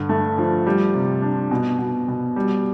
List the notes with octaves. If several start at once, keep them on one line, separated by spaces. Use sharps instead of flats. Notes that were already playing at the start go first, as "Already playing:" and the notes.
Already playing: G2 D3
A3
F3
G3
C3
D4
B2
B2
B2
G3